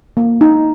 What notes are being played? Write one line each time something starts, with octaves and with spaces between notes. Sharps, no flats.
A#3
D#4